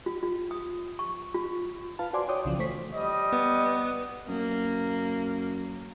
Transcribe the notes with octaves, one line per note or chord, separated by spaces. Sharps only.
F4
F4
D#6
C#6
F4
F4 B4 F5 A5
F#4 C5 D5 G#5 C6 D6
F#4 C#5 G5 D6 D#6
C2 C#3 E3 F3
E3 A3 C5 C#6 B6
G3 D#5
B3
F#2 A#3